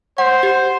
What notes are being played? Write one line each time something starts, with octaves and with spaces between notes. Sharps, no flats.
C5 F#5
G4